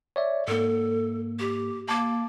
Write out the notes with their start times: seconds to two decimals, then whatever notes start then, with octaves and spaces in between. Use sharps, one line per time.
0.16 C#5 D5 E5
0.48 G#2 A#3 A4
1.40 G4
1.89 A#3 A5 D6